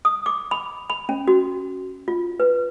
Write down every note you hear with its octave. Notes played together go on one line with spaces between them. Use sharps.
D#6
D6
B5
B5
C#4
F#4
F4
B4